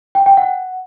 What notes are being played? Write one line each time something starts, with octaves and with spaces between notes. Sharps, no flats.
G5
G5
F#5